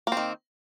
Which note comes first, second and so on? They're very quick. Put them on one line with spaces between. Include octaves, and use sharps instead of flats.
A#3 C4 D#3